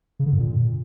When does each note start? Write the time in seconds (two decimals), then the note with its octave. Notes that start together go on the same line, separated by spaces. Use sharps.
0.19 C#3
0.26 D3
0.33 G2
0.39 A#2